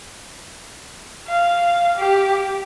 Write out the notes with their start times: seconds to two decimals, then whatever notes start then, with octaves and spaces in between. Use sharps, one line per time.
1.28 F5
1.97 G4